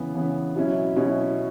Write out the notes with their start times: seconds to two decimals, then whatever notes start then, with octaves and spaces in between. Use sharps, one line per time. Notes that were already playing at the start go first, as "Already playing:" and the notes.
Already playing: C#3 E3 B3
0.15 C#3 E3 B3
0.56 B2 F#3 C#4 E4
0.96 B2 F#3 C#4 E4